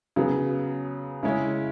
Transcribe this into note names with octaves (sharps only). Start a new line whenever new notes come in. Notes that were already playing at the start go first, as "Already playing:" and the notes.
C#3 F#3 B3
C#3 G#3 C#4 E4